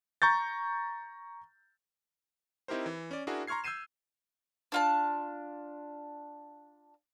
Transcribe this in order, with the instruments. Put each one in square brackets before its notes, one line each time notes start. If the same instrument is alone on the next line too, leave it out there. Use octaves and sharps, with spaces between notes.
[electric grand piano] A#5 C#6 G6 A6
C4 D#4 E4 G4 A#4 C5
E3
C#4 D5
D4 E4 F#4 G#4 A#4
A#5 C6 C#6 F6 G#6 C7
E6 G6 G#6 C7 D#7 E7
[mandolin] D4 F4 A5